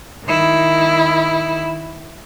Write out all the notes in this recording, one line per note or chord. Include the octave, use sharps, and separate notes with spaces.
D#3 E4